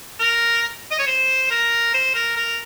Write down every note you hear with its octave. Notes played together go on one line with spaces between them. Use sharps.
A#4
D#5
C#5
C5
A#4
C5
A#4
A#4